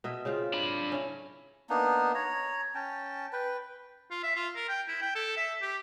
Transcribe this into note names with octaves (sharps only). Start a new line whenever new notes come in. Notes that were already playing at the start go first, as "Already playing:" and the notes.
B2 D#5 E5
C#3 C4 F4
D4 B5
C#4 E4
A#3 B3 D4 D#4
C#5 A#5
C#4 G5 A5
B4 G5
F4
E5
F4
A#4
G5
E4
G5
A4
E5
G4